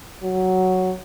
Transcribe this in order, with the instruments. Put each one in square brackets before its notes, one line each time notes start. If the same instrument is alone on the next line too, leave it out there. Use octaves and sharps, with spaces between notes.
[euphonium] F#3